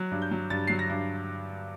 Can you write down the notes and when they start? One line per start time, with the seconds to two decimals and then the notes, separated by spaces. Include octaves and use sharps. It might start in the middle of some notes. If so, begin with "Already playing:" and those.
Already playing: F#3 F#6
0.11 G2
0.22 G6
0.31 F#3
0.50 G2 A6
0.67 F#3 C7
0.79 A#6
0.89 G2